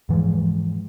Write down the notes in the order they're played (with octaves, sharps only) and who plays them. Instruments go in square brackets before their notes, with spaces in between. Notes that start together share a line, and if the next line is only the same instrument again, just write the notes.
[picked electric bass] G#2 E3 F3 G#3